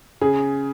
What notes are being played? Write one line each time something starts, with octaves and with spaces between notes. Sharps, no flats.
C#3 G#4